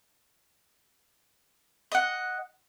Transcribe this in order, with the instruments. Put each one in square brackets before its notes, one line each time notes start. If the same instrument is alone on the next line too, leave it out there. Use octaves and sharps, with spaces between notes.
[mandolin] D#5 F#5